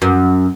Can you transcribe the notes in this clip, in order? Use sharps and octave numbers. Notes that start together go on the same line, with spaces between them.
F#2